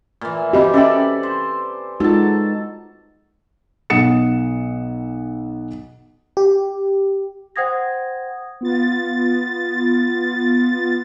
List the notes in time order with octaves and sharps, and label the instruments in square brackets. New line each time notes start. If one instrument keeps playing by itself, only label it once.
[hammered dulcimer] A#2 E3
[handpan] C4 G4 [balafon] F#4 D#5 B5
[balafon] C#4 E5 G5 [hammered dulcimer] A4 D5 B5
[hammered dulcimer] C5
[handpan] G#3 D#4 F#4 [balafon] F4 [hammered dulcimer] A4 A5
[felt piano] B1 F#5 D#6 C#7 E7
[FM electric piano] G4
[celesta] C5 F#5 G5 D#6 G#6 A#6
[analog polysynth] B3 F4 A6